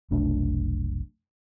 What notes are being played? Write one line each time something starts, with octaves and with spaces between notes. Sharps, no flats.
F1 B1 A3 D4